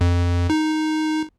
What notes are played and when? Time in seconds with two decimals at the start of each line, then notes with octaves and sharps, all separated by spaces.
0.01 F2
0.50 D#4